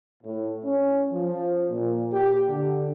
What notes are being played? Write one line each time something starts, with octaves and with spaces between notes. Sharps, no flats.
A2
C#4
F3
A#2
G4
D3